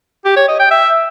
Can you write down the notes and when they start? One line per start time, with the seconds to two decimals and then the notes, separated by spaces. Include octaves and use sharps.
0.25 G4
0.36 C#5
0.48 D#5
0.59 G5
0.71 E5